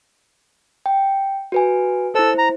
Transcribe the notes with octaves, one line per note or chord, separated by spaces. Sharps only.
G5
F#4 B4 G#5
E4 A4 C5 E6
A#5